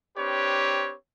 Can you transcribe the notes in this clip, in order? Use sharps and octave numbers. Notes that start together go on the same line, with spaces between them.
C4 D4 G4 B4 C#5